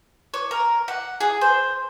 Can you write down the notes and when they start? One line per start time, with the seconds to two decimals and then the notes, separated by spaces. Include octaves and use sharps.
0.34 C#5
0.51 A#4
0.88 F#5
1.21 G#4
1.41 C5